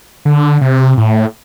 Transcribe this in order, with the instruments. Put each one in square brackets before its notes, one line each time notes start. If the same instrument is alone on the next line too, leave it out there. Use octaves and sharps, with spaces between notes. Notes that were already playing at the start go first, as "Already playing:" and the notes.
[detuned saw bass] D3
C3
A2